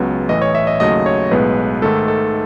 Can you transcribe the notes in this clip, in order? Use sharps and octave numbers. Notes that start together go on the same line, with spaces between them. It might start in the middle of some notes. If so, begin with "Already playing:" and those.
Already playing: C#2 C#3 F#3 B3
A1 A2 E3 D#5
C#5
E5
D#5
D#2 C#3 F#3 A3 D#5
C#5
B1 A2 G#3 B3 B4
G#2 D#3 A3 A4
A4